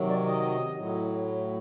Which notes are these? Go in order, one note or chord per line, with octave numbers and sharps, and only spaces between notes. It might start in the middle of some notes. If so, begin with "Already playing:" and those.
Already playing: C3 D#3 F#3
D5
D#5
A2 F#3